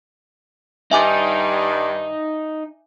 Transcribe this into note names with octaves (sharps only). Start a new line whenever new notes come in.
G2 D#3 G3 D#4 E5 G#5 D6